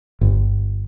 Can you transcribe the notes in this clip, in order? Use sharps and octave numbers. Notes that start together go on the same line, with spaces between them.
G1